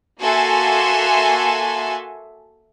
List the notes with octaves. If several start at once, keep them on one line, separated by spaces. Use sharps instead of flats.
A#3 F#4 A4 E5 G#5 C6